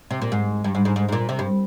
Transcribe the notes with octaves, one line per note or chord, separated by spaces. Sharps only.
C3
A#2
G#2
G2
G#2
G#2
G#2
G#2
A#2
C3
G2